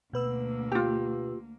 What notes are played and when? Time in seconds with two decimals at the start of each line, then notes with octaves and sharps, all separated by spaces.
0.13 D2 B2 A#3 B4 E6
0.72 F4 G4